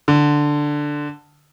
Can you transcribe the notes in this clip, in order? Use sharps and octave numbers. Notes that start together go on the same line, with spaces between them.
D3